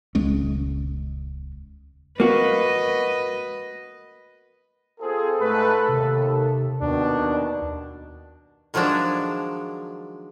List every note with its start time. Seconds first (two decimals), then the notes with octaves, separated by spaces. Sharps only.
0.15 D#1 C#2 G#3 C#4
2.20 A#3 F#4 B4 D#5
5.00 C4 F4 G#4 A4
5.40 G#2 A3 B4
5.88 D#2 C3
6.81 D#2 B2 D#3 D4
8.74 D#3 F3 F#3 G#3 D4